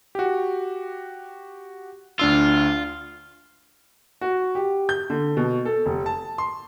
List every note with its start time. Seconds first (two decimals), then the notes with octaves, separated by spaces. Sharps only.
0.15 F#4 G4
2.19 D2 D4 F4 E6
4.21 F#4
4.55 G4
4.89 G6
5.10 D3
5.37 B2
5.65 A4
5.86 F1
6.06 A5
6.38 C6